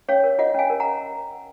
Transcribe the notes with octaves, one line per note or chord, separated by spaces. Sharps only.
C#4 C#5 F5
A#4
F4 D#5 F#5
C#4 F5 G#5
A#4
F#5 A#5